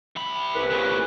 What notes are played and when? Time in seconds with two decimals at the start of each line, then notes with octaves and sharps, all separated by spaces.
0.16 C3 B5
0.54 C2 B4
0.71 A#2 C#3